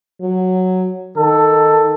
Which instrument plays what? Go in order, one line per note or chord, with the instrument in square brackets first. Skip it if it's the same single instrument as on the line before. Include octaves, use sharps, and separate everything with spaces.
[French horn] F#3
[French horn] D#3 [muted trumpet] A4